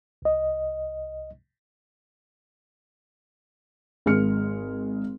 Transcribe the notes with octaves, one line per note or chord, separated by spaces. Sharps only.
C2 D#5
G#1 G#3 G#4 F6 C#7